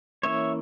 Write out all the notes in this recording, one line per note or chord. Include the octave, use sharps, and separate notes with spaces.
E3 A#3 C#4 C#5 E5